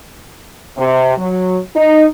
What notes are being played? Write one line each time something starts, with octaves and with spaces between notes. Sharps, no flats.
C3
F#3
D#4